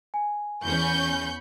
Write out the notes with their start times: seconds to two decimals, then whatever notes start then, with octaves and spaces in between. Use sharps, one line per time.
0.14 G#5
0.65 E2 C#4 B5 C#6 G6